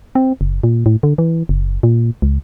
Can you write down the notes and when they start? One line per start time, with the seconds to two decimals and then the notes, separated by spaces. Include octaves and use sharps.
0.15 C4
0.41 F#1
0.64 A#2
0.86 A2
1.03 D3
1.18 E3
1.49 F#1
1.83 A#2
2.22 C#2